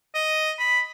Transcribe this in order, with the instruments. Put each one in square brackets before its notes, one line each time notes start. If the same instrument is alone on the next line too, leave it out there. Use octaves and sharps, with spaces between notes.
[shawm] D#5
B5